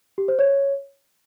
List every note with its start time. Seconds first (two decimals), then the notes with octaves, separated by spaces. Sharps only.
0.18 G4
0.28 C5
0.39 C#5